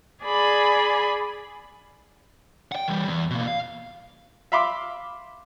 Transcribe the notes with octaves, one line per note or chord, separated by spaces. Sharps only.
G#4 D5 G#5 B5
F#5 G5
E3 G3
E2
B2 A#3
F5
E5 F5 B5 C6 D6